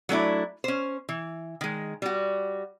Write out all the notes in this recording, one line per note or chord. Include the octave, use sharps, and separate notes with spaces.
F#3 A3 D4 E4
C#4 C5
E3
D#3 G#3
G3 F#4